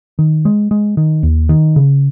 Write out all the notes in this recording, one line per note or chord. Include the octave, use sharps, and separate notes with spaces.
D#3
G#3
G#3
D#3
D#2
D#3
C#3